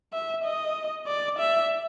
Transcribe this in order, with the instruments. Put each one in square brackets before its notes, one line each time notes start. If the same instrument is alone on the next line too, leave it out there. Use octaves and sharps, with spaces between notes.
[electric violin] E5
D#5
D5
E5